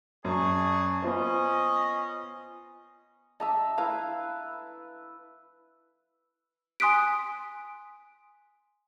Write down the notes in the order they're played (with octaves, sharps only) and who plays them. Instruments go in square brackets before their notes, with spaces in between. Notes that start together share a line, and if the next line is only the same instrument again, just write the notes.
[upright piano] F#2 [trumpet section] D4 G#4 C#6
[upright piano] B3 F4 C5 [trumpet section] C#4 D#5
[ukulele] D#5 A#5 [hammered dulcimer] E5 A5
[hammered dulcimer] E4 B4 [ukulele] F5 A#5
[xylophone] G#5 C6 D#6 F#6 B6 D7